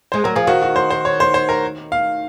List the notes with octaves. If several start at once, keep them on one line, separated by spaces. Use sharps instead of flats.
G#3 C5
F#3 A#4
F3 G#4
D#3 F#4
F#4
C5
C5
C#5
C5
C5
A#4
F5